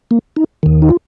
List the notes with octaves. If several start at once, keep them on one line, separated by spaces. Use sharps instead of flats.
A#3
D#4
D#2 D#3
D#4
F4